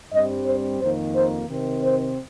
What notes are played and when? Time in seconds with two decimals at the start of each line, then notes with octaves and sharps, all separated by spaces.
0.11 G2 G3 C4 D#5
0.45 C5
0.80 F2 D#3 A#3 C5
1.14 C5
1.48 C3 D#3 C4
1.82 C5